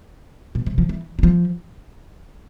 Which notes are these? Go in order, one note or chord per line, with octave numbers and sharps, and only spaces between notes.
B2
C3
F3
E3
F#3
F3